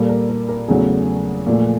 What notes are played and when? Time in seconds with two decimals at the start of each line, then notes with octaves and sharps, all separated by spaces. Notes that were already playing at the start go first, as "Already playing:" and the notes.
Already playing: A#2 G3 A#3 A4
0.09 A#4
0.29 A#4
0.49 A#4
0.68 E2 C#3 F#3 A3 G#4
1.47 A#2 F3 A3